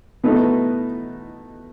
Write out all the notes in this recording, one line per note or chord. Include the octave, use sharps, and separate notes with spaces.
B2 A3 B3 D#4